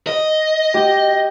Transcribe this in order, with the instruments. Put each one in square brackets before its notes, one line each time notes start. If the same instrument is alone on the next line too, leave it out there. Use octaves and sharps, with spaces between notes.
[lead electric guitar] D#5
[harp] G4